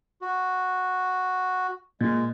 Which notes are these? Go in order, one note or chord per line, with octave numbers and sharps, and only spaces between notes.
F#4
A#2 G#3